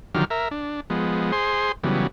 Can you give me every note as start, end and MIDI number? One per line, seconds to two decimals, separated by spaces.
0.15 0.25 50
0.15 0.25 51
0.15 0.25 53
0.15 0.25 54
0.15 0.25 67
0.15 0.25 89
0.30 0.49 70
0.30 0.49 76
0.51 0.80 62
0.90 1.32 53
0.90 1.32 56
0.90 1.32 59
1.32 1.72 68
1.32 1.72 72
1.32 1.72 84
1.84 2.07 49
1.84 2.07 52
1.84 2.07 54
1.84 2.07 55
1.84 2.07 59